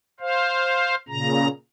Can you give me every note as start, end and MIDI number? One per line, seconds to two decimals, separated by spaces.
0.20 0.95 72
0.20 0.95 77
1.09 1.48 46
1.09 1.48 49
1.09 1.48 82